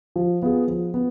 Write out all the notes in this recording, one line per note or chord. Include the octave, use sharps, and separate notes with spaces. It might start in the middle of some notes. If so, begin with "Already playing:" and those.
F3
B3 F4 G#4
F3
B3